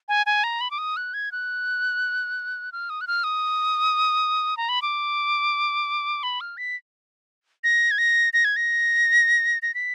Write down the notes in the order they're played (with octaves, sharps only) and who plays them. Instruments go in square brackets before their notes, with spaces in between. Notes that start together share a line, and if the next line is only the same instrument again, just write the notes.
[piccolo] G#5
G#5
A#5
B5
D6
D#6
F#6
G#6
F#6
F6
D#6
F#6
F6
D#6
A#5
B5
D6
B5
F6
B6
A#6
G#6
A#6
A#6
G#6
A#6
A#6
B6